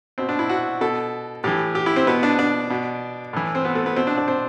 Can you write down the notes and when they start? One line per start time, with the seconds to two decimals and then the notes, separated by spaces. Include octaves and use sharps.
0.18 B2 C4
0.29 D4
0.39 E4
0.49 F#4
0.81 B2 A4
1.44 A2 E3 G4
1.75 G4
1.86 E4
1.96 C4
2.07 B2 B3
2.23 D4
2.39 D4
2.70 B2
3.33 A2 E3
3.55 C4
3.65 B3
3.75 A3
3.86 B3
3.96 B2 C4
4.07 D4
4.18 D4
4.28 C4